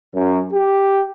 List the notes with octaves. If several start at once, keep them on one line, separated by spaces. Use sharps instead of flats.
F#2
G4